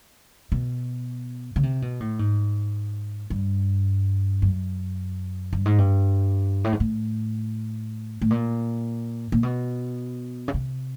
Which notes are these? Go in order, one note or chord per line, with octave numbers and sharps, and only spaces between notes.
B2
C#3
C3
B2
A2
G#2
G2
F#2
G2
G#2
G2
A2
G#2
A2
A2
A#2
A#2
B2
C#3
C3